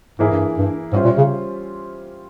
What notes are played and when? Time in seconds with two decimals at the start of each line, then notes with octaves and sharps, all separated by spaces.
0.19 G#2 E3 A#3 E4 G#4
0.32 G2
0.58 G2
0.92 G#2 G3 C#4 F4 C5 E5
1.05 A#2
1.18 C#3